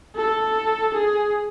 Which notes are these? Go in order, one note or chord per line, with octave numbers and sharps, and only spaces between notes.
A4
G#4